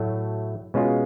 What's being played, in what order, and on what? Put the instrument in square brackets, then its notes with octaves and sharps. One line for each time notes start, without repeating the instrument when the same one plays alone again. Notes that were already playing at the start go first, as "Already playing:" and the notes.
Already playing: [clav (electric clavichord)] A2 F#3 A3
B2 G#3 C#4 F4